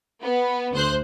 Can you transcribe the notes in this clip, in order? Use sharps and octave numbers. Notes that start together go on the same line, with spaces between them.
B3
D2 C5 F#6